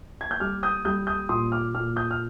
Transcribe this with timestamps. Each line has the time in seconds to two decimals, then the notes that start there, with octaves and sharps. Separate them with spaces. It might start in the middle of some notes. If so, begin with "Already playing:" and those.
0.21 G#6
0.31 G6
0.40 G3 D6 F6
0.63 D#6 G6
0.85 G3 D#6 G6
1.07 D#6 G6
1.29 A#2 C6 D#6
1.52 D6 F6
1.74 A#2 D6 F6
1.96 D#6 G6
2.11 F6